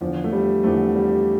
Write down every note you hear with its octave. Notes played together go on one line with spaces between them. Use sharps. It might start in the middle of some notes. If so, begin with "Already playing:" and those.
E2 D3 F3
A3
G3
E2 D3 F3 A3
G3